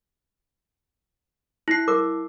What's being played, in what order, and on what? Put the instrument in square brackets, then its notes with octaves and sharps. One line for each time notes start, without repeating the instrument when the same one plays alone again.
[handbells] E4 C7
[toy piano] A#4 D6